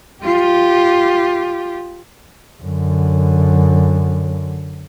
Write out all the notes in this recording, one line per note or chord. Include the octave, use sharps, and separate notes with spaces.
F4 G4
F#2 D3